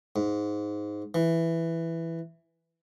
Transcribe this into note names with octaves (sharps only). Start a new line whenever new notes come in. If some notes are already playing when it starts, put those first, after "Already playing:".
G#2
E3